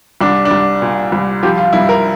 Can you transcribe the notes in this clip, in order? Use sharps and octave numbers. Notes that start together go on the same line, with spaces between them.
C2 D4
D4
C2
A#2
C2
F3 G4
F4
G2 E4
A#4